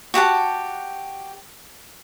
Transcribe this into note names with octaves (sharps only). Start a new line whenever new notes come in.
F#4 G4 F#5 A5